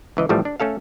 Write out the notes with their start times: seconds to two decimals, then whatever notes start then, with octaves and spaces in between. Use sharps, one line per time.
0.17 C#2 E3 D#5
0.29 A1 A2 F3 G3 A3
0.45 D4
0.60 A3 C#4 A4 F5